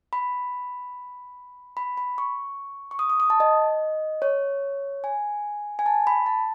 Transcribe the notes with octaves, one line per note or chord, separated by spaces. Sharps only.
B5
B5
B5
C#6
C#6
D#6
D#6
D#6
A5
D#5
C#5
G#5
G#5
A5
B5
A5